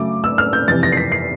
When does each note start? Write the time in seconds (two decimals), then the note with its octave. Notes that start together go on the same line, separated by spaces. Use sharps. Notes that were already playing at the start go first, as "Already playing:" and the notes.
Already playing: C#3 F#3 A3 D6
0.24 E6
0.38 F6
0.53 G6
0.68 F2 C3 E3 A6
0.83 A#6
0.92 C7
0.97 B6
1.12 C7